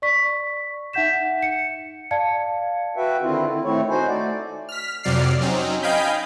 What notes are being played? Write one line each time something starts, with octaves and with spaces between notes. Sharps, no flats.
D5 C#6 B6
D#4 E5 F#5 G6 B6 E7
C#7
D5 F5 A5 G#6 C#7
F#4 B4 E5 G5
D3 D#3 C4 E4 F4
E4
D#3 A3 C4 E4 C#5
D#4 F#4 C5 G#5
A3 D5
F6 B6
F2 C3 F#3 D5 F6 C7
F#3 C4 C#4 D#4
D#5 F5 G5 G#5 B5 G6